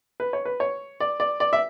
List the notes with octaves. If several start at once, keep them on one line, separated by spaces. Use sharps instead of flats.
B4
C#5
B4
C#5
D5
D5
D5
E5